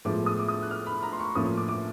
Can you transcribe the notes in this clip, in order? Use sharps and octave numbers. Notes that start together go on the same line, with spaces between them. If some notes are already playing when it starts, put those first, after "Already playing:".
A2 F3 G#3 B3 D6
D#6
D6
D#6
F#6
F6
B5
A#5
C6
C#6
A2 F3 A#3 C#4 D#6
D6
D6